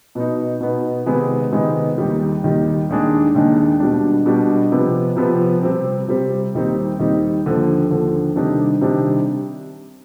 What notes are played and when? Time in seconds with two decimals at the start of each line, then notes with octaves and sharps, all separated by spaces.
0.15 B2 B3 D#4
0.61 B2 B3 D#4
1.06 C3 D#3 G#3 B3 D#4
1.52 C3 D#3 G#3 B3 D#4
1.98 D#2 D#3 G3
2.44 D#2 D#3 G3
2.89 D#2 D#3 G#3 D4
3.35 D#2 D#3 G#3 D4
3.80 B2 G3 D4
4.26 B2 G3 D4
4.72 C3 F3 B3
5.16 C3 F3 B3
5.63 C3 G3 C4
6.08 C3 G3 C4
6.54 D#2 D#3 G3 C4 D#4
6.99 D#2 D#3 G3 C4 D#4
7.45 D#2 D3 F3
7.90 D#2 D3 F3
8.36 C3 D#3 G3 D4
8.81 C3 D#3 G3 D4